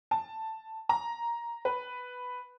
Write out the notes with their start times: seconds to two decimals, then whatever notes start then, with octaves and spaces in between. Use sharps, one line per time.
0.11 A5
0.89 A#5
1.65 B4